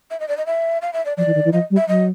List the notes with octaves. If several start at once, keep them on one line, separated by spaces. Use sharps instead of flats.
E5
D#5
D5
D#5
E5
F5
E5
D5
F3 D5
E3
D#3
E3
F3 D#5
G3
E5
F#3 D#5